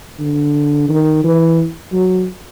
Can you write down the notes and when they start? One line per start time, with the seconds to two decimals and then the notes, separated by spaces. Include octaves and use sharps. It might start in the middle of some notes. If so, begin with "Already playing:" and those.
0.20 D3
0.89 D#3
1.24 E3
1.93 F#3